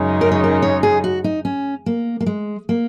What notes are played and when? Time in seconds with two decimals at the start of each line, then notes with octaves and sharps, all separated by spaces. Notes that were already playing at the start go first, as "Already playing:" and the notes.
Already playing: F#2 C#3 G#3 D#4
0.21 A#4
0.32 C#5
0.44 A#4
0.62 C#5
0.83 G#4
1.04 F#4
1.24 D#4
1.45 C#4
1.86 A#3
2.20 A#3
2.26 G#3
2.69 A#3